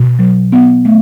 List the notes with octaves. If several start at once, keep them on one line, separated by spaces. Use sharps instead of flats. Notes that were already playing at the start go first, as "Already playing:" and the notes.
Already playing: B2
F#3
B3
A3